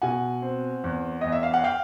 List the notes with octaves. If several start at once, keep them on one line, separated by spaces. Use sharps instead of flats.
B2 F#5 G#5
C4
E2
E2 D#5
E5
F5
F#5
F5 G5